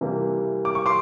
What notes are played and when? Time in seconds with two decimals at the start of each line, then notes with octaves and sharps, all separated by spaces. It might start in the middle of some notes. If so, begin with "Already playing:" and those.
0.01 C3 E3 G3 A#3
0.65 D6
0.75 C#6
0.86 C6 D6